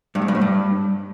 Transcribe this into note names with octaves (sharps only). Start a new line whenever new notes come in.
G2
G#2
G2
A2
G2